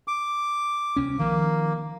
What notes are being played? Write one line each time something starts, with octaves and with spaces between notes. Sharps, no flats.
D6
C2 C#4
D#3 F3 A#3